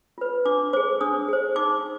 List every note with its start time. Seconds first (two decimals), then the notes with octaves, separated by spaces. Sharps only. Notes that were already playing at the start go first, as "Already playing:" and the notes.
0.18 F4 B4
0.45 D4 D6
0.73 G#4 C5 D6
1.01 D4 D#6
1.28 G#4 C5
1.56 D#4 D6